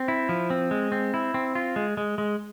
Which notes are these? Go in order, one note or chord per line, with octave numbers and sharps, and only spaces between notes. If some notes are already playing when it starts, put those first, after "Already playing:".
Already playing: C4
E4
F3
C4
G#3
C4
E4
C4
F4
G#3
G#3
G#3